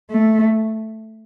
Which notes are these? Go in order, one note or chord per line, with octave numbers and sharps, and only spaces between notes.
A3